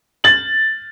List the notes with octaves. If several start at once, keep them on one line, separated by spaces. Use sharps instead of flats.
A6 F#7